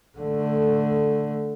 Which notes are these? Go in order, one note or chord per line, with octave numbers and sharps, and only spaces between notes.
D3 A3